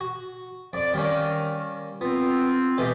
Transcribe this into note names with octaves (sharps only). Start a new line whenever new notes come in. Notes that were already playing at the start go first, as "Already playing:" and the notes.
F#4
F2 D5
D#3 G3 A#3 C#4
B3 C4 F4
B2 E3 G#3 G4 A4 D#5